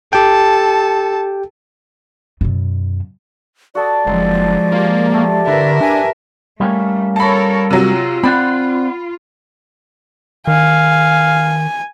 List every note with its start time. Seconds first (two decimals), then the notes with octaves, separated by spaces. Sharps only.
0.13 G4 A4 G5 A5
2.41 F#2 B2
3.75 F#4 A4 D5 D#6
4.07 F#1 F3 G#3 C4 D#4 C5
4.72 A#3 F4 G4
5.11 A3 G4
5.47 D3 E4 A#4 B4 E5
5.81 D4 G#5
6.61 G3 A3 A#3 C#4
7.16 A4 A#4 C#5 A5 B5
7.71 C3 F#3 F4
8.23 C4 D5 F#5 B5
10.47 D#3 F5 G#5